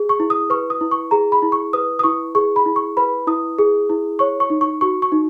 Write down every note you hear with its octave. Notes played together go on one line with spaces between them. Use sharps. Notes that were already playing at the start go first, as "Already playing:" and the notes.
Already playing: G#4
C#6
E4
D#6
B4 C#6
D#6
E4
C#6
G#4 A#5
B5
E4
C#6
B4 D#6
D#6
E4 C#6
G#4 C#6
B5
E4
C#6
B4 B5
E4 D#6
G#4
E4
C#5 C#6
C#6
D#4
C#6
F#4 C#6
C#6
D#4